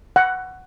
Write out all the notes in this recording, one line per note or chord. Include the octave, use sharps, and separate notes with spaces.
F#5